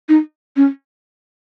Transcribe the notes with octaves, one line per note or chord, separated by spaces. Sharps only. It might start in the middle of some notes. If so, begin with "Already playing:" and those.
D#4
C#4